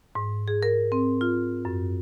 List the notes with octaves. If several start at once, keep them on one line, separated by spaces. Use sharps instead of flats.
G#2
G#4
A#4
C4
F4
F#2